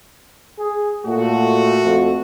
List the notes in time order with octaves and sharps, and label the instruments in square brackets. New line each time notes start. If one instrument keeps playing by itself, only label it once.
[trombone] G#4
[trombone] A#2 [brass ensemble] A3 F#4
[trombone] F2